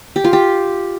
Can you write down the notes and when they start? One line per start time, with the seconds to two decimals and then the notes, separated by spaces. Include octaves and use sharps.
0.16 G4
0.24 F4
0.33 G4